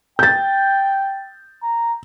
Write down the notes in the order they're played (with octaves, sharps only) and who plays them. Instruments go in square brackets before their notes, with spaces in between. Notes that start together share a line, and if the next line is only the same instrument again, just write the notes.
[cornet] G5 [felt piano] G6 A6
[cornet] A#5